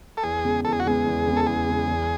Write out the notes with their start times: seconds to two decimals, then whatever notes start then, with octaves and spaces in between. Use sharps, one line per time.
0.17 A4
0.23 E2 G#4
0.45 C#3 G#3 B3
0.65 E2 A4
0.72 G#4
0.80 F#4
0.85 C#3 G#3 B3 G#4
1.06 E2
1.26 C#3 G#3 B3
1.37 A4
1.46 E2 G#4
1.68 C#3 G#3 B3
1.87 E2